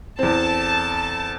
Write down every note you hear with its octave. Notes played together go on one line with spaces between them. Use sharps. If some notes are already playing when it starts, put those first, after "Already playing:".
E2 C4 A4 A5